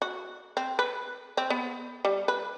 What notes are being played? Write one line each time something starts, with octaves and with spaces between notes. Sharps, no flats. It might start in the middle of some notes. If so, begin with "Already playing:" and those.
F#4
C4
B4
C4
B3
G3
B4